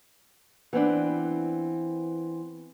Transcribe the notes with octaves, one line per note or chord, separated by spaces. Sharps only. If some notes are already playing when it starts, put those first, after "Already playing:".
E3 B3 C4 D4